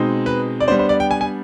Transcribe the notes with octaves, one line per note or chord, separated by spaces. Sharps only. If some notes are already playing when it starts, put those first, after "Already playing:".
Already playing: B2 G#3 C4 D#4
B4
D5
G3 B3 D4 C5
C5
D5
G5
G#5
G#5